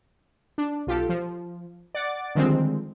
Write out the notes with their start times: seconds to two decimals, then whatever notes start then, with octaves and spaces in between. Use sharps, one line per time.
0.58 D4
0.87 B1 F4 G4 A4
1.09 F3
1.95 D5 F#5 A6 D7
2.35 D3 D#3 F3 G3 G#3 C4